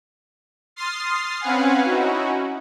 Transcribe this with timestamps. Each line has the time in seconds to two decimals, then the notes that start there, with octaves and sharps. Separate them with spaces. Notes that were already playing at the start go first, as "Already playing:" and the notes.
0.76 C6 D#6 F6 A6 C7
1.41 C4 C#4 B4 F5 F#5 G#5
1.84 C#4 D#4 E4 F#4